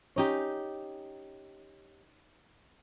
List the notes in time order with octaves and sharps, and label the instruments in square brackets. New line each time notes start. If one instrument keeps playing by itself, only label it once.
[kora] C#4 D#4 G4